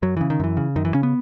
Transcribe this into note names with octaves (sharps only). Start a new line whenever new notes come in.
F#2 F#3
C#3 E3
D#3
F#2 E3
C#3
F#2 D#3
E3
C#3 C#4
B3